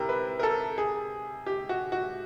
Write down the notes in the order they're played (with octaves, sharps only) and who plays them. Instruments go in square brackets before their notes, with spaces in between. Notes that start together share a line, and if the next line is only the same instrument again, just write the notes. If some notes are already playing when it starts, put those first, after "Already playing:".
Already playing: [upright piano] C3 [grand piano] E4 A#4
[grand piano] B4
A#4
A4
G#4
G4
F#4
F#4